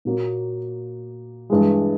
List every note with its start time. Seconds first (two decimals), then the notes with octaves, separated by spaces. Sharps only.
0.05 A#2 F#3 A#3
1.50 G2 E3 G#3